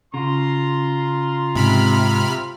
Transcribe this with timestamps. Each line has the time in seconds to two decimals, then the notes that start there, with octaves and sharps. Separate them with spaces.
0.14 C#3 F4 A#5 C6
1.55 G#2 C3 B5 F6